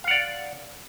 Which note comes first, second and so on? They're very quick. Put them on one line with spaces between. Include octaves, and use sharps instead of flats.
F5 F#5 D5